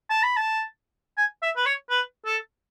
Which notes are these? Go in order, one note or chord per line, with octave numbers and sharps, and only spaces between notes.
A5
B5
A5
G#5
E5
B4
C#5
B4
A4